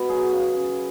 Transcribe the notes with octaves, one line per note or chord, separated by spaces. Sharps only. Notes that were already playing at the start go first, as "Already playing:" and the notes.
Already playing: B2 B4
F#3 G#4
C#3
C#3